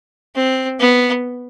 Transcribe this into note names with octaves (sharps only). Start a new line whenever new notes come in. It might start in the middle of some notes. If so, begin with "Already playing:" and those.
C4
B3